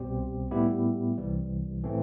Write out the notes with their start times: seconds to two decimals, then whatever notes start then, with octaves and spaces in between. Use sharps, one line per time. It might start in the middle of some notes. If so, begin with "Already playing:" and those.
Already playing: C2 B2 G3 C4 G4
0.51 A2 G3 B3 E4 G4
1.17 C2 C3 E3 G3
1.83 A2 E3 A3 C4